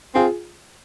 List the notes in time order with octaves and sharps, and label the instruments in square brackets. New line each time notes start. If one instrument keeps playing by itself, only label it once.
[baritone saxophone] C4 [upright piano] F4 G#4